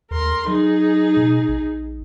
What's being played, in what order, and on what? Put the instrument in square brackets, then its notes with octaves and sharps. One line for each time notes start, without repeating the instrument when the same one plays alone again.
[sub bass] D#2 [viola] A#4 C6
[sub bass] F#3 [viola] D#4 G#4
[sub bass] B2
A#1